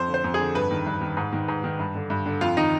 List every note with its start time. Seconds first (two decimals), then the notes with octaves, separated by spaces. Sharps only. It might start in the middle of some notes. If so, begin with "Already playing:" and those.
Already playing: F2 C5
0.08 D3
0.14 C5
0.24 F2
0.34 G#4
0.39 D3
0.55 G2 B4
0.71 D#3
0.86 G2
1.01 D#3
1.17 G#2
1.33 D#3
1.48 G#2
1.64 D#3
1.79 G2
1.95 D3
2.10 G2
2.26 D3
2.41 F2 F4
2.57 D#3 D#4